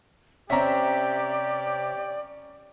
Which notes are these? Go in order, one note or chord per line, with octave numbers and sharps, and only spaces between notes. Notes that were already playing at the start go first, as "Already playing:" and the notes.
C3 C#4 G4 D5 E5 A#5